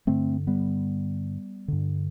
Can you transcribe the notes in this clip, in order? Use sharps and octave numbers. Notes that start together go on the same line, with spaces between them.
G2 D3 A3 C4
G3 B3
G2 D3